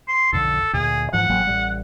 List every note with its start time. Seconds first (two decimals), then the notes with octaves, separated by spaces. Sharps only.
0.08 C6
0.33 B1 F2 D3 A4
0.73 D2 A#2 G#4
1.13 G#2 E3 F3 F#5
1.29 A1 F#3 A#3
1.47 A1 G3